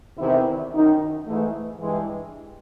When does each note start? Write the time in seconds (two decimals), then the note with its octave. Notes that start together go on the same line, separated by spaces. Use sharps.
0.17 E2 C3 D#3 E4
0.71 F#2 D#3 D#4
1.25 G#2 E3 A3
1.80 G2 E3 G#3